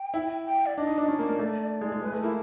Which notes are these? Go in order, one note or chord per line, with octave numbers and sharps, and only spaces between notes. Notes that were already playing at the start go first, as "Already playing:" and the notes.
Already playing: G5
E4
G5
D5
D4 D#5
D#4
D4
D#5
C#4 D5
A#3
A#3
A3
G#3
G#3
G#3 B4
A3
A#3 E4